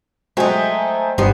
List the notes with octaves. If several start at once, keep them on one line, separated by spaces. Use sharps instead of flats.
F#3 G#3 A3 D#4 C5 G5 G#5
G1 G2 G3 B3 D#4 C5